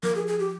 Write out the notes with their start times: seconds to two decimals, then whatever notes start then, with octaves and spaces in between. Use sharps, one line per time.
0.03 F3 A#4
0.16 G#4
0.27 G#4
0.39 G4